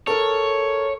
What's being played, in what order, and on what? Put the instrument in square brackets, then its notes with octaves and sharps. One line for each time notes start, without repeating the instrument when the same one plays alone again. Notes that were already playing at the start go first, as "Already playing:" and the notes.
[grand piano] A4 A#4 [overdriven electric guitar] C#5